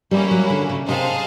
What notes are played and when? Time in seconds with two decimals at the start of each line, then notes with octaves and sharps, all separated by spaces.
0.11 G3 A#3 C#4 E4
0.31 F#3
0.50 D3
0.69 C#3
0.88 C3 D#4 G#4 C5 F5 A5